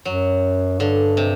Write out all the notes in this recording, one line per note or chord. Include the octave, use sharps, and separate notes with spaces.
F#2 F#3
G2 D3
C3